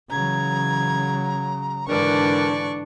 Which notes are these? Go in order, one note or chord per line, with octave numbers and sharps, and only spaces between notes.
C#3 E3 F#3 A#5 G#6
G#2 D3 E3 D4 A#4 D5 C#6